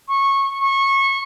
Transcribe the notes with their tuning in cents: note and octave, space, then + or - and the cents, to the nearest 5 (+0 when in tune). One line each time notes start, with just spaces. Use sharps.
C#6 -15
C#6 -20